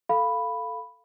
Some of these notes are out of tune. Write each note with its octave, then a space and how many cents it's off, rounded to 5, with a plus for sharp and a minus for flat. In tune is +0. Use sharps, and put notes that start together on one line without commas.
A4 +0 F5 +0 B5 +0